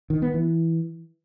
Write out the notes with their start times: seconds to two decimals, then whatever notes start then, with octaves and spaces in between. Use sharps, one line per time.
0.10 D#3
0.22 B3
0.34 E3